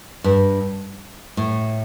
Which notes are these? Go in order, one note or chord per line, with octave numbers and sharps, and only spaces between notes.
G2
A2